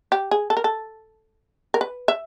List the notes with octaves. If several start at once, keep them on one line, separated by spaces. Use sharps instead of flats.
G4
G#4
A4
A#4
A4
A#4
B4
E5